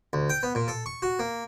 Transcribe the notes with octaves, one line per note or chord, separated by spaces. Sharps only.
D2
G5
B3
A#2
A4
C#6
F#4
A#3